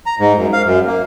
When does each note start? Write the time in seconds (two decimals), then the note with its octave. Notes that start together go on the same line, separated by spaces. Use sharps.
0.06 A#5
0.19 G#2
0.37 F#2
0.53 F5
0.65 F#2
0.87 A#3